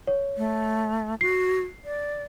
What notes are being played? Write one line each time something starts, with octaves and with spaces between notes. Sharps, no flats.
C#5
A3
F#4 C7
D5